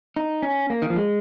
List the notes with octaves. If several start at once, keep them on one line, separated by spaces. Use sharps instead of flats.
D#4
C#4
A#3
D#3
F3
G#3